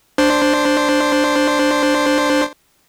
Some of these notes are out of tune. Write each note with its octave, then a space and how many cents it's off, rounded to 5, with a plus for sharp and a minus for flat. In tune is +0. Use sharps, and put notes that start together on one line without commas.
D4 +0 C5 +0